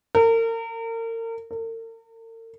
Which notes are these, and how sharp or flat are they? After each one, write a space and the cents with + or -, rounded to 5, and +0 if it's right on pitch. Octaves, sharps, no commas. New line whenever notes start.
A#4 -35
A#4 -45